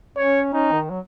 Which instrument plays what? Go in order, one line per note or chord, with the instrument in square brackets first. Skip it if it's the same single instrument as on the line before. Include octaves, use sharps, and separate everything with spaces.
[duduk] C#4 [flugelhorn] C#5
[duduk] C#4 [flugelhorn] D#4
[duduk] D#3
F#3